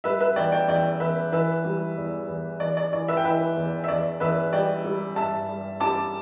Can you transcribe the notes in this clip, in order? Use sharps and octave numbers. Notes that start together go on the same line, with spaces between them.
G3 B4 E5
B4 E5
E2 D5 G5
D5 G5
E2 D5 G5
E2 B4 E5
E3 B4 E5
G3
E2
E2
E2 D5
D5
E3 D5
B4 E5
G5
E3 B4 E5
E2
E5
E2 D5
E2 B4 E5
G3 D5 G5
G3
G2 E5 A5
G2
G3 A5 D6